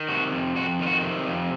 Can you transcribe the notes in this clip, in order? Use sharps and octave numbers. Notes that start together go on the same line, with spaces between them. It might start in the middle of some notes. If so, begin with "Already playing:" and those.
Already playing: D#3
C3 F#4
F2
F2 F#4
D#3 F4
F#4
C3
F2